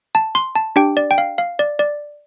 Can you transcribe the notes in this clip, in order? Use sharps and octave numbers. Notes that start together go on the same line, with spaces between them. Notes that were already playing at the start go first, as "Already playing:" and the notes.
A5
C6
A5
D4 G4 G5
D5
G5
F5
F5
D5
D5